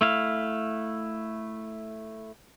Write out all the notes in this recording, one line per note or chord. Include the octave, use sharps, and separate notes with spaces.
A3 E4 F5